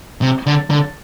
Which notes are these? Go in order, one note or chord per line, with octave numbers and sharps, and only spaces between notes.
C3
D3
D3